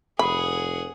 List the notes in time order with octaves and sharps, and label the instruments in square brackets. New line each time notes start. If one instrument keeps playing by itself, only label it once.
[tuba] F1 [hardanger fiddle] G#4 F#5 [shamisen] B5